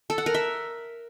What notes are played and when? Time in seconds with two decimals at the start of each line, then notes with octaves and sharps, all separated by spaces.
0.10 A4
0.18 F#5
0.26 A#4
0.34 E5